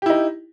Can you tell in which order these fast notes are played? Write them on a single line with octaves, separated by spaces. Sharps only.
G4 E4 D#4